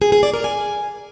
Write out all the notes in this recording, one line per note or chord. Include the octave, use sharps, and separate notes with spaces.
G#4
G#4
D5
A#4
G#5